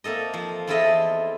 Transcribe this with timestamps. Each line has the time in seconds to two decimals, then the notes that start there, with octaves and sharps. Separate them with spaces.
0.04 A#3 C4 A4 D#5
0.34 F3
0.67 E2 C4 E4 F4 A4 D#5